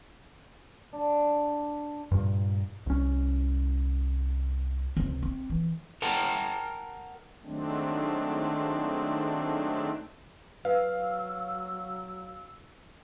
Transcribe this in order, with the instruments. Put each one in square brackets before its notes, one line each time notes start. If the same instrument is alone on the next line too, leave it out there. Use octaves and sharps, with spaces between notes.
[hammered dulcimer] D4
[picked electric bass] G2 A#2
C2 C#4
[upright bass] C#2 C3
C4
E3
[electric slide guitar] A#4 F#5 G5 A5 A#5
[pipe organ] D#3 F#3 G#3 A3 C4 D4
[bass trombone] F#3 [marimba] B4 [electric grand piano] F5 [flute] E6